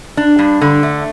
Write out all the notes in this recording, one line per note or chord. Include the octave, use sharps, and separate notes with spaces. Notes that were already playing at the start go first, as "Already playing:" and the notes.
D4
G2
D3
A3